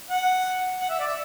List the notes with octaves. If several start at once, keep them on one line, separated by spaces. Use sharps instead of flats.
F#5
F#5
E5
D5
E5